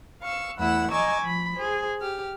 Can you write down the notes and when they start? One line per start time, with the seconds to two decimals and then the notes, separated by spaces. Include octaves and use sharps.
0.22 F5 C#6 E6
0.58 E2 A3 E4 F#5 B5 E6
0.91 D#5 G#5 A#5 C#6 D6 E6
1.23 F3 B5
1.55 G#4 C5
2.01 G4 F6